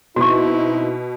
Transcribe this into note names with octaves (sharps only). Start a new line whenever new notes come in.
B2 C4 D#4 E4 F#4 C#6